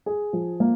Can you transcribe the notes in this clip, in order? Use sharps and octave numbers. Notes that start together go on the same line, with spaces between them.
G#4
F3
A#3